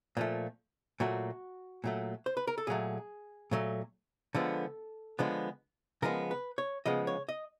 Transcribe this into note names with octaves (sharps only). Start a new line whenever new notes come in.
A#2 F3 A3
A#2 F#3 A3 F#4
A#2 F#3 A3
C5
B4
A#4
A4
A#2 F#3 A3 G#4
A#2 F#3 A3
D3 F3 G#3 B3 A4
D3 F3 G#3 B3
C#3 F3 G#3 B3 A#4
B4
C#5
C#3 F3 G#3 B3 D#5
C#5
D#5